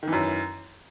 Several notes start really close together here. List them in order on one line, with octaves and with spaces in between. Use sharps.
D#3 E3 F#2